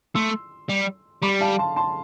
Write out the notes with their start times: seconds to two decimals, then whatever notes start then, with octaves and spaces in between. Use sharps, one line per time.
0.15 A3 C6 E6
0.69 G3
1.22 G3 B5 D6
1.41 F5 A5
1.58 A5 C6
1.76 A5 C6